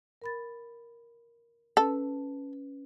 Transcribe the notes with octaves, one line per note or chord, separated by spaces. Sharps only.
A#4 B5 A6
C#4 A4 B4